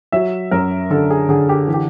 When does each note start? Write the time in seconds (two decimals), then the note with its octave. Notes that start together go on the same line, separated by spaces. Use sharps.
0.12 F#3 E5
0.51 F#2 A#4
0.91 D3 A4
1.10 G#4
1.29 D3 G#4
1.49 G4
1.67 E3
1.74 G4